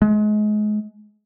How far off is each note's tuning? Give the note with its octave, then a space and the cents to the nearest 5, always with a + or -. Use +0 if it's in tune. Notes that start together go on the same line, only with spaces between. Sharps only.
G#3 +30